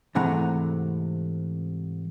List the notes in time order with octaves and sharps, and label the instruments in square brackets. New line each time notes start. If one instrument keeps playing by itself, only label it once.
[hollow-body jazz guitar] G#2 C3 E3 A3 F#5 A#5